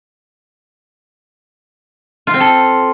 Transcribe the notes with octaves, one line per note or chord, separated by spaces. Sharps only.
F4
C4
A4